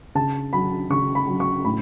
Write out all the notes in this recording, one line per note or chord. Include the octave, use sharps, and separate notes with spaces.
C#3 A5
F#3 B5
C#3 C#6
B5
F#3
C#6
A2 B5